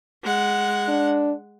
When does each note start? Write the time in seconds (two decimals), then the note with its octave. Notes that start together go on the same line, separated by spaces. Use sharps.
0.23 G#3 F#5
0.88 D4